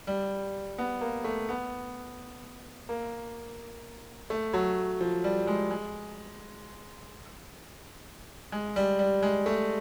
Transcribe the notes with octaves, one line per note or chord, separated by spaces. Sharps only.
G3
B3
A#3
A3
B3
A#3
A3
F#3
F3
G3
G#3
G#3
G#3
G3
G3
G#3
A3